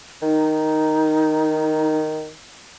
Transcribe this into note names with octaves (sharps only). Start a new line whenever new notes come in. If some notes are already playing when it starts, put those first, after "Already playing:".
D#3 D#4